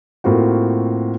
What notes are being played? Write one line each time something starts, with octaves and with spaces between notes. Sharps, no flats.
A2 A#3 C4 F4 F#4